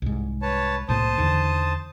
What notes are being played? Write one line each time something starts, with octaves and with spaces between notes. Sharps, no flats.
C2 G#2
B4 C#5 A5
C2 A2 A#3 C5 A5 D#6
E2 D3 D#3